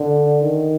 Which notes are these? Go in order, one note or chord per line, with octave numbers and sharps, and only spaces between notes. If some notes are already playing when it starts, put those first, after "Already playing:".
Already playing: D3
D#3